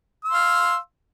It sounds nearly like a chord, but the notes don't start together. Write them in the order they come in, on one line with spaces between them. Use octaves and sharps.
E6 C6 F5